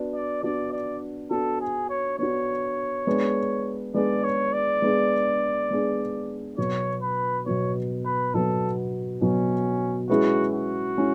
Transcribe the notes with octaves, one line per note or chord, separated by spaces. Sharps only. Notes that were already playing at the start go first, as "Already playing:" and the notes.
Already playing: B3 D4 F#4
D5
B3 D4 F#4 D5
D5
B3 D4 F#4 A4
G#4
C#5
B3 D4 F#4 C#5
G#3 B3 D4 G#4
G#3 B3 D4 G#4 D5
C#5
D5
G#3 B3 D4 G#4
G#3 B3 D4 G#4
B2 F#3 B3 C#5
B4
B2 F#3 B3 C#5
B4
B2 F#3 B3 A4
B2 F#3 B3 C#4
G#3 C#4 E4 F#4 G#4 B4
F#4
G#3 C#4 E4